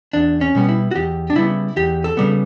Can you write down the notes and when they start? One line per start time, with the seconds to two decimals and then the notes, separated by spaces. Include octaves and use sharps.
0.13 E2 D4
0.41 C#4
0.55 B2 G3 B3
0.69 E4
0.91 F#4
0.95 E2 G4
1.30 D4
1.35 C#3 G3 B3 E4
1.76 E2 G4
2.04 A4
2.17 C#3 G3 B3